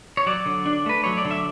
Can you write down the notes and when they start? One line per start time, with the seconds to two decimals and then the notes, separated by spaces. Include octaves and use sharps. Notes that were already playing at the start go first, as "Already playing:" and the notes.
0.17 C#5
0.26 F#3 D5
0.46 D3
0.66 D4
0.86 A3 B4
1.04 F#3 C#5
1.17 D5
1.25 D3
1.31 E5